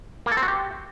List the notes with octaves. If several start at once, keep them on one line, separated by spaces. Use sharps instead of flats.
A#3
A4
C4
F#4
G4